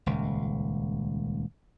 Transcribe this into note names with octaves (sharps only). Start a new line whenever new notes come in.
D#1 C#2